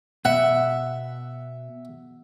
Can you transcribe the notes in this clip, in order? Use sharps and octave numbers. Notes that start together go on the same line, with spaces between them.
B2 E5 F#5